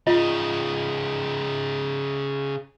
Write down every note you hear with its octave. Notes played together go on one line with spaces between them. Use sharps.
C#3 D#4 F4 D#5